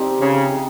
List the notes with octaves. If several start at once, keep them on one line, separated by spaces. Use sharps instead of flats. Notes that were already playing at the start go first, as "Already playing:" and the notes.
Already playing: C3 F3 C4 D#4 G4
C#3